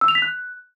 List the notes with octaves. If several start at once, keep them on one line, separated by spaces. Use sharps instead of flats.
E6
F7
B6
F#6